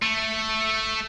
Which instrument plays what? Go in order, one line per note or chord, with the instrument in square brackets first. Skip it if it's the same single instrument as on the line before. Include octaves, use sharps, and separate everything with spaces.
[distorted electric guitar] A3